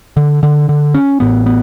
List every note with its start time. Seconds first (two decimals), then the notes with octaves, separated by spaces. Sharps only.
0.17 D3
0.43 D3
0.69 D3
0.94 C#4
1.20 A1 A2 B3
1.46 B3